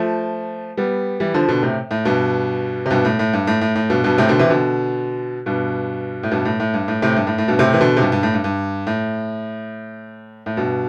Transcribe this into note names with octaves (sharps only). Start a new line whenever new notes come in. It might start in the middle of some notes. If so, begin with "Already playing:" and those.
Already playing: F3 A3
G3 B3
E3 G3
D3 F3
B2 D3
A2 C3
A2
G2 B2
C3
G2 B2
A2
A2
G2
A2
A2
A2
G2 B2
G2 B2
A2 C3
B2 D3
C3 E3
B2 D3
G2 B2
A2
G2 B2
A2
A2
G2
A2
A2 C3
G2
A2
A2
G2 B2
A2 C3
E3
B2 D3
C3
G2 B2
G2
A2
G2
G2
A2
A2
G2 B2